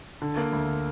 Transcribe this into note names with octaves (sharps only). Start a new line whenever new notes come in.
D3
A#3
D2